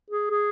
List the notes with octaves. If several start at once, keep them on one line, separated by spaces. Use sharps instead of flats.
G#4
G#4